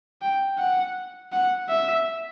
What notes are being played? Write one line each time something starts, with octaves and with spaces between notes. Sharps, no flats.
G5
F#5
F#5
E5